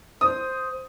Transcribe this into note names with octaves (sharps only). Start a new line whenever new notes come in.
C5 D#6